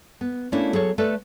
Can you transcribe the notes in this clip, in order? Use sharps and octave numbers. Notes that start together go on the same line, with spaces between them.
B3
A3 A#3 C#4 D4 E4
F#3 G#4 A4 C#5
A3 A4 B4 D5